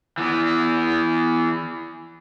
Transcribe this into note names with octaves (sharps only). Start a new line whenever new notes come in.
E3 B3